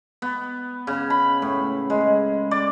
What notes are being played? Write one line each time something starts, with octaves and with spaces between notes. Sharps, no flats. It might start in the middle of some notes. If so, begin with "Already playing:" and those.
B3
C#3
B5
A2
G#3
D5